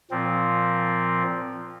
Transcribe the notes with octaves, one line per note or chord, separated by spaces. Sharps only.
A#2 F3 C4